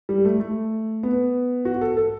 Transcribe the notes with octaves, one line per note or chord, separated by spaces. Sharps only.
G3
A3
A3
B3
F#4
A4
A4